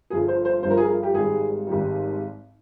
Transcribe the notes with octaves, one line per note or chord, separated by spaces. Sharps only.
G1 G2 D3 F3 G#4
C5
C5
G1 G2 D3 F3 C5
A#4
G#4
A#4
G4
G#1 G#2 G3 G#4
G#1 G#2 G3